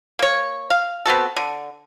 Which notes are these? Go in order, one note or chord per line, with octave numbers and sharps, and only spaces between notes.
A#3 C#5
F5
B3 C4 F#4 A4
D3